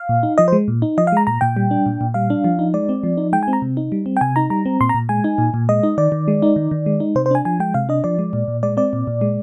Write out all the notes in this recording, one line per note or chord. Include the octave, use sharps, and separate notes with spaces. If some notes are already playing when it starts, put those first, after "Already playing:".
Already playing: F5
A#2
D#4
F3 D#5
C5
G#3
A#2
D#4
F3 D#5
F5
G#3 A#5
A#2 A#5
A#2 G5
G3
D4
A#2
A#2
G3 F5
D4
F3
D#4
G#3 D5
C4
F3
D#4
G#3 G5
G#5
C4
A#5
C3
D#4
G3
C4
G5
C3 G#5
D#4 A#5
G3 A#5
C4
A#2 C6
A#5
A#2
G#3 G#5
D#4
A#2
A#2
G#3 D#5
D#4
D#3 D5
D#3
G#3
D#4
D#3
D#3
G#3
D#4
C3 C5
C5
D4 G#5
F3 G#5
G#3 G5
C3 F5
D4 D#5
F3 D5
G#3
A#2
A#2
G#3 D5
C4 D5
A#2
A#2
G#3